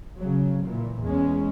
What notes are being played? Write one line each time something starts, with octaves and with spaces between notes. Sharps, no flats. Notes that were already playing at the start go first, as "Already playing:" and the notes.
C#3 F#3
A#2 E3
E2 G#3 C#4